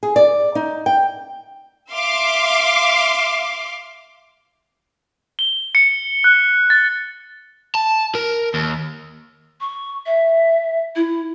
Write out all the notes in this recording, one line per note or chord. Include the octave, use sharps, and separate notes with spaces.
G#4
D5
D#4
G5
E5 F5 C6 D6
G7
C#7
F#6
A6
A5
A#4
D#2
C#6
E5
E4